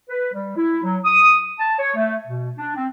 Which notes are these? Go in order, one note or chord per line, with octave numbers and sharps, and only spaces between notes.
B4
G3
E4
F#3
D#6
A5
C#5
A3
B2
D4
C4